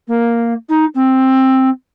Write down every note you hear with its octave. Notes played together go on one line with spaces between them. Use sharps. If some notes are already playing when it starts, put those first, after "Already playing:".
A#3
D#4
C4